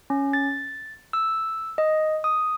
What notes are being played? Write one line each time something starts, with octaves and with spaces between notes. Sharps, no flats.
C#4
A6
E6
D#5
D#6